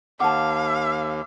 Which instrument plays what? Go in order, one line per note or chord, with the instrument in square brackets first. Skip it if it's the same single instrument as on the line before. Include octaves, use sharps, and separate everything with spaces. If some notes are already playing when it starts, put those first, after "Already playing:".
[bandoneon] D#2 [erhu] F5 [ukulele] F#5 A5 [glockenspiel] D6